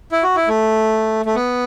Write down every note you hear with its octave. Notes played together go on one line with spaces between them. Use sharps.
E4
F#4
E4
A3
A3
B3